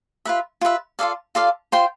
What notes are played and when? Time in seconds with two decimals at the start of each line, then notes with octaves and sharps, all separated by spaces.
0.25 F4 B4 E5
0.61 F4 B4 E5
0.99 F4 A4 D5 F5
1.35 F4 A4 D5 F5
1.72 F4 C5 G5 C6